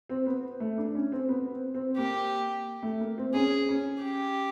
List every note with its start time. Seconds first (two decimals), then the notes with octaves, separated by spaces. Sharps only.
0.09 C4
0.26 B3
0.60 A3
0.78 D4
0.95 C#4
1.12 C4
1.29 B3
1.52 C4
1.74 C4
1.97 A#3 G4
2.83 A3
3.00 A#3
3.18 C4
3.34 C#4 G#4
3.69 C#4
4.03 G4